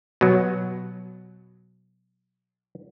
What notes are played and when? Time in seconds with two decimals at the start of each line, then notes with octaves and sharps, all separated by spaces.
0.21 B2 F#3